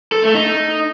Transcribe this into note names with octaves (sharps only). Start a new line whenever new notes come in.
A4
A3
D#4